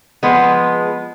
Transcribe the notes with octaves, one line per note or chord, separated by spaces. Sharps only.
F3 G#3 B3